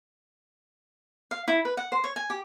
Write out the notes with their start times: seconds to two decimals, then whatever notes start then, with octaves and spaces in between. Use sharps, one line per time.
1.31 F5
1.48 E4
1.65 B4
1.77 F#5
1.92 C5
2.04 C#5
2.16 G#5
2.30 G4